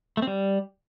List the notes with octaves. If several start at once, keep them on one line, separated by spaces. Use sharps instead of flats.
A3
C4
G3